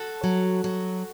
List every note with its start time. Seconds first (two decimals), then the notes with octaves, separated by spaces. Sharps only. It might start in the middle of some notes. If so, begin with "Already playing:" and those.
Already playing: F#4 A4
0.24 F#3
0.64 F#3